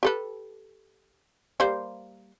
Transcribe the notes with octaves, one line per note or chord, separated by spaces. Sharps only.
G4 A4 B4
G3 A#3 C5